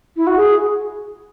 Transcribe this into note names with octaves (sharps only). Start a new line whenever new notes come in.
E4
F#4
G#4